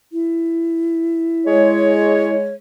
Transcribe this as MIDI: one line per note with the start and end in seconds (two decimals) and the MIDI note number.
0.13 2.35 64
1.46 2.53 56
1.46 2.53 73